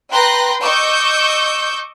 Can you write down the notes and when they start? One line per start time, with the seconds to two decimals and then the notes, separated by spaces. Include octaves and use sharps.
0.11 B4 G5 A#5 C6 F#6 A#6
0.62 D#5 C#6 D6 E6 G6